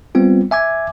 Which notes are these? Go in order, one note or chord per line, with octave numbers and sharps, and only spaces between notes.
G3 B3 C4 F4
E5 G#5 D6 G#6